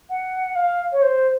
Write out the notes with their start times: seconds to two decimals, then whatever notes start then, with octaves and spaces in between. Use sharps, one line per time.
0.09 F#5
0.55 F5
0.92 C#5
1.01 C5